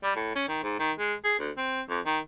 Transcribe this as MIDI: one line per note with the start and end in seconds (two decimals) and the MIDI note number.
0.03 0.12 55
0.16 0.31 45
0.35 0.45 61
0.48 0.62 51
0.63 0.77 44
0.79 0.92 51
0.99 1.14 56
1.24 1.34 68
1.39 1.51 38
1.57 1.81 60
1.89 2.00 41
2.06 2.19 51